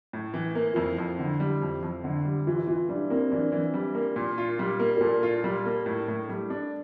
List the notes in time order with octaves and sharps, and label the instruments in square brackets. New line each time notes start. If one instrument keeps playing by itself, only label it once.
[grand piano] A2
E3
A#3
[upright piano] F4
[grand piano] F2 [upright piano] E4
[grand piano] F2
D3
G3
F2
F2
D3
G3
[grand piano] E3 [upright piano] F4
[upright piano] E4
[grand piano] E3 [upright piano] F4
[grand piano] G3 [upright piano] D4
[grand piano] A#3 [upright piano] C4
[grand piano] E3 [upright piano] D4
[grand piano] E3
G3
A#3
A#2
F4
G3
A#3
[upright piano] A#4
[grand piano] A#2 [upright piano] A4
[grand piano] F4
G3
A#3
A2
A2
G3
D4